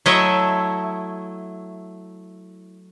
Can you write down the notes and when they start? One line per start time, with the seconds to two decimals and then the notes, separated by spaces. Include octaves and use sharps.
0.06 F#3 A3 E4 C#5 D#5 E5